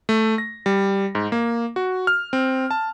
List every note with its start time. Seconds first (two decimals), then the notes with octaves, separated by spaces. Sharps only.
0.09 A3
0.38 A#6
0.66 G3
1.15 G#2
1.32 A#3
1.76 F#4
2.07 F6
2.33 C4
2.71 A5